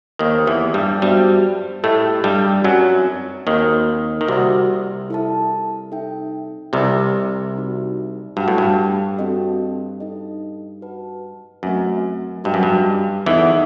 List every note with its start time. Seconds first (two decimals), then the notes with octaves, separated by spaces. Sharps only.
0.19 D#2 D#3 D#4 G4 C5 D#5
0.47 E2 E3
0.74 G2 G3
1.02 G2 G3 B3 F#4 C5 E5 G5
1.83 A2 A3 G4 D#5 G5
2.24 G2 G3
2.64 F#2 F#3 C4 D#4 F#4 B4
3.47 D#2 D#3 C4 F#4 C5
4.21 D#3
4.28 C2 C3 F#4 C5 F#5
5.10 E4 A4 E5 A5
5.92 D#4 A4 E5 G5
6.73 C2 C3 E4 B4 D#5
7.55 C4 D#4 F#4
8.36 G2 F#4 B4 F#5 A5
8.48 A2
8.58 G2
9.18 C4 F#4 A4 D#5 G5
10.00 D#4 A4 D#5
10.81 F#4 B4 F#5 A5
11.63 F#2 A3 C4 F#4 B4 E5
12.44 G2 F#4 B4 D#5 G5
12.54 F#2
12.63 G2
13.26 E2 E3 D#4 A4 D#5 F#5